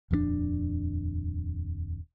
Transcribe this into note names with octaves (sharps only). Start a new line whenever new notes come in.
D#1 F2 G3 D4